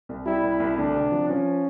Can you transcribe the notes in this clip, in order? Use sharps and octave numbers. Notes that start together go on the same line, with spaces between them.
C2
G3 E4
C2
C2
D2 D4
C3
F3
F3 C#4